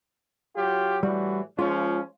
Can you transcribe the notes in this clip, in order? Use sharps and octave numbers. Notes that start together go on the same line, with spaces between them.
F#3 F4 G4
A2 E3 G3 F#4
F3 G#3 C#4 F4